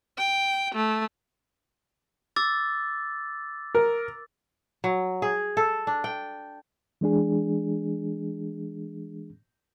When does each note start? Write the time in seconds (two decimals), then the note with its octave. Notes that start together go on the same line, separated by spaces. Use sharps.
0.18 G5
0.75 A3
2.36 D6 E6 A6
3.75 A#4
4.84 F#3
5.22 G#4
5.57 A4
5.87 D4
6.04 G5
7.01 E3 G#3 D4 G#4